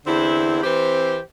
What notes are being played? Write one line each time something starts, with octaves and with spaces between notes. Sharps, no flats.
E2 D3 C4 E4
E3 C4 G4 C5